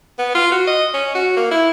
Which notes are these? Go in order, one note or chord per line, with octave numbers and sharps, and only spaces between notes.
B3
F4
F#4
D#5
C#4
F#4
A#3
E4